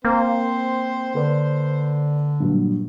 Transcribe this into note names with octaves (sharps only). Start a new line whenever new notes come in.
A#3 C4 C5
D3 B4 D5
G2 A#2 F#3